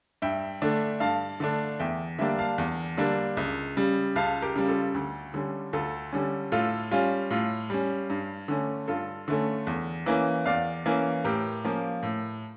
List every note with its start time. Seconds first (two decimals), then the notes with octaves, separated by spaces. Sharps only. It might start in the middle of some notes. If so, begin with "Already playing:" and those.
0.22 G2 E5 G5
0.62 D3 A3 D4
1.00 G2 F5 A5
1.40 D3 A3 D4
1.79 E2 E5 G5
2.19 D3 G3 A#3 D4 E5 G5
2.39 F5 A5
2.58 E2
2.97 D3 G3 A#3 D4
3.37 C#2
3.77 C#3 G3
4.16 C#2 F5 A5
4.42 G4 A#4
4.55 C#3 G3
4.68 F4 A4
4.95 D2
5.34 D3 G3 C#4
5.73 D2 F4 A4
6.13 D3 G3 C#4
6.52 A2 F4 A4
6.91 G3 C#4 F4
7.30 A2 F4
7.70 G3 C#4
8.10 G2
8.48 D3 A3 C#4
8.88 G2 F4 A4
9.28 D3 A3 C#4
9.67 E2
10.06 E3 A#3 C#4
10.46 E2 D5 F5
10.86 E3 A#3 C#4
11.24 A2 G4 A#4
11.64 F3 A#3 C#4
12.03 A2